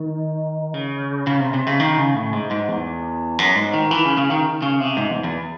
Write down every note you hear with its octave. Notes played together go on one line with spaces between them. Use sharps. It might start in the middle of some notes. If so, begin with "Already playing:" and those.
Already playing: D#3
C#3
C#3
C3
C3
C#3
D#3
C#3
A2
G#2
G#2
E2
F#2
G#2
D#3
E3
C#3
C#3
D#3
C#3
C3
G#2
E2
E2